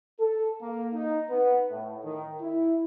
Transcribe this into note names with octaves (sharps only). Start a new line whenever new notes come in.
A4
A#3
D#4
B3
A2
D#3
E4